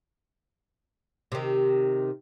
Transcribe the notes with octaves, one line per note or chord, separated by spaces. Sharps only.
C3 D#3